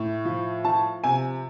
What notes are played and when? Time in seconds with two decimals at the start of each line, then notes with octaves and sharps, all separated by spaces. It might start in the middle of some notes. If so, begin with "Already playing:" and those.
Already playing: A2
0.25 F3
0.64 F3 A5
1.04 C3 G#5